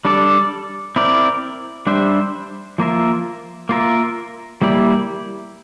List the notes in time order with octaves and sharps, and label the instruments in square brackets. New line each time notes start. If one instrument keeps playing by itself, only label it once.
[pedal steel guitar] G3 D4 A4 D5
C4 E4 A#4 D5
G3 D4 G4 C5 E5
F3 A#3 F4 A#4 E5
A#3 F4 A#4 E5
G3 A#3 E4 G4 D5